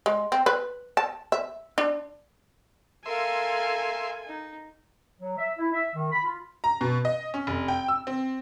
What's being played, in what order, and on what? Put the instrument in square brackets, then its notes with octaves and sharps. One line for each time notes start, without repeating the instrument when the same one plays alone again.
[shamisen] G#3
C4
B4
A5
E5
D4
[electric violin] A4 G#5 [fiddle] A#4 F5 [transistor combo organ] E5 C6
[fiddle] D#4
[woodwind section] F#3
E5
E4
E5
D#3
B5
F4
[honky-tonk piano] A#5
B2
D#5
C#4
F1
G5
E6
C4